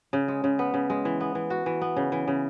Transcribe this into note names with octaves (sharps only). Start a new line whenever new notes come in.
C#3
G#3
C#3
B3
C#3
G#3
E3
B3
E3
F#4
E3
B3
C#3
E3
C#3